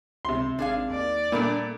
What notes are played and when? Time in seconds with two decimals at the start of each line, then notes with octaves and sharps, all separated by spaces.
0.25 C#2 C3 C6
0.59 G#1 D4 G#4 F5
0.90 D#2 D5
1.32 A#2 G3 A3 A#3 D4